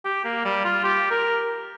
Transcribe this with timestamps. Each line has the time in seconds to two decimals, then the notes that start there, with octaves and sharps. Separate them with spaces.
0.05 G4
0.25 A#3
0.45 G3
0.65 F4
0.84 G4
1.11 A#4